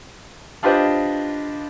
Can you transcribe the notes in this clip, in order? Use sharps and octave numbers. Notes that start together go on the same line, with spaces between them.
D4 F4 G4 B4 C5 D#5